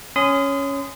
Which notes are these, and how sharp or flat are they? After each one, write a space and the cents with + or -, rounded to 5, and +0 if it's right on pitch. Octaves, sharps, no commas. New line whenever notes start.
C#4 +0 C6 -40 D#6 +0